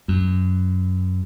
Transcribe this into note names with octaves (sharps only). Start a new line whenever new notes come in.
F#2